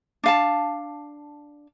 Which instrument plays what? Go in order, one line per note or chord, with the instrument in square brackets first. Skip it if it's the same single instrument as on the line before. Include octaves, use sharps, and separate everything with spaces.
[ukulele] D4 F5 A5